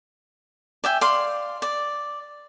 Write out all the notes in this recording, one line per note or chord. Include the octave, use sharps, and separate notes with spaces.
D5 E5 G5 G#5
D5 F5 C6
D5